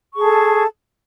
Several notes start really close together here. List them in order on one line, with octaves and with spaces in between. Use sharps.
C#6 G#4 A5 A4